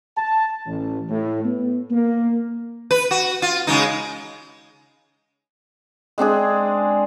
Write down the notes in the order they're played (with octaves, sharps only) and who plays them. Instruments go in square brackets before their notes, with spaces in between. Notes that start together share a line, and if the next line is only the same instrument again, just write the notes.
[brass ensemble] A5
A1
A2
B3
A#3
[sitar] B4
F#4
F4
C#3 G#3 D#4
[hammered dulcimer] G#3 C4 D4 G#4